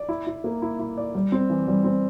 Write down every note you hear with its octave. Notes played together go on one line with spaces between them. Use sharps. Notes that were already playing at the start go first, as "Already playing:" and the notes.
Already playing: D5
E4
E4
A#3
E4
E4
D5
G3
C4
E3
G3
C4